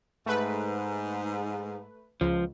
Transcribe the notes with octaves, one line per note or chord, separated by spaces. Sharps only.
G#2 A3 B4
C#2 F3